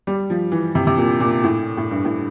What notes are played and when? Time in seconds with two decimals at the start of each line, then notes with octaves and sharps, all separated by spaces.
0.07 G3
0.30 F3
0.52 E3
0.75 C3
0.87 C3
0.98 A#2
1.20 A#2
1.44 A2
1.77 A2
1.91 G2
2.05 A2